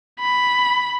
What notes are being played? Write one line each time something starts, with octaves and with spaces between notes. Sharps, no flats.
B5